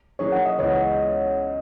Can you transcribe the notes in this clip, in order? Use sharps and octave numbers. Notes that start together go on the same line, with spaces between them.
F#3 A#3 C#4 E4 G#4 C#5
F#5
D#5
C#2 C#3 E3 G#3 B3 C#5